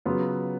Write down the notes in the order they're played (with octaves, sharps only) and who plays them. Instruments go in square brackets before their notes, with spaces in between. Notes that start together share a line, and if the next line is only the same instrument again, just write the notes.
[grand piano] C#3 F#3 B3 F4